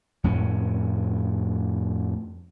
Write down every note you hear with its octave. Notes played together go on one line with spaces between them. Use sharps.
F2 A2 C#4